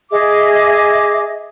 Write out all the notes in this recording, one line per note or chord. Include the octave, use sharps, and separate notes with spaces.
G#4 D#5 E5 D6